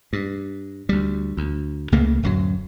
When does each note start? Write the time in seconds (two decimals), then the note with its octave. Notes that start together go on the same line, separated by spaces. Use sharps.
0.13 G2
0.89 D2 G3
1.37 D2
1.92 C#2 C#3 A3 A#3
2.23 D1 F#2 F#3